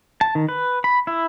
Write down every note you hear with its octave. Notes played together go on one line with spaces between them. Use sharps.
A5
D#3
B4
B5
E4